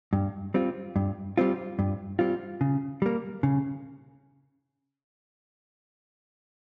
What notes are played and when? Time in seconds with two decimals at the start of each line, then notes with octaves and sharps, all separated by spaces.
0.13 G2
0.54 G3 C4 F4
0.96 G2
1.38 G3 C4 F4
1.79 G2
2.19 G3 C4 F4
2.61 C#3
3.02 G3 A#3
3.43 C#3